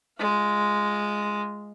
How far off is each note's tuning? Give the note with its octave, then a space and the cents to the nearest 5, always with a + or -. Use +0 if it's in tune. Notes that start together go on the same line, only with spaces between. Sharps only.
G#3 +0 F4 -15